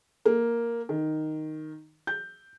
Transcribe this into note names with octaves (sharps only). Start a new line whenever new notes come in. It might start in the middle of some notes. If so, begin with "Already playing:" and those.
A#3
D#3
G6